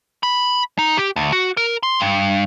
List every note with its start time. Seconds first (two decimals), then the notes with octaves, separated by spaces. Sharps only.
0.23 B5
0.79 D#4
0.97 G4
1.16 D2
1.32 F#4
1.57 A#4
1.83 C6
2.00 G2